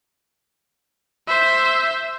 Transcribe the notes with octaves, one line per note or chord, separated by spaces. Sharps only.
C5 E5